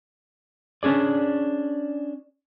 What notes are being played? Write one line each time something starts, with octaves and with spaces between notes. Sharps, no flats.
C#4 D4 G#4 D5